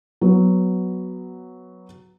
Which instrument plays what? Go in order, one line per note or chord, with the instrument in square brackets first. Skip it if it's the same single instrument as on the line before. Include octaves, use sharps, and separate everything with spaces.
[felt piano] F#3 B3